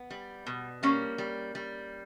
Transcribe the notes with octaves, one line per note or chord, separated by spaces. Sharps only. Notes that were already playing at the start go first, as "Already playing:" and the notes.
Already playing: B3
G3
B2
G3 A#3 C#4
G3
G3